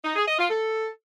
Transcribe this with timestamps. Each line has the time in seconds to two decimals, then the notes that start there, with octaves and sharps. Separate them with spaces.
0.05 D#4
0.16 G#4
0.27 D#5
0.38 F4
0.50 A4